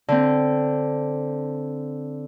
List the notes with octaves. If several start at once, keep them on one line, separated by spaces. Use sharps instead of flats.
D3 C4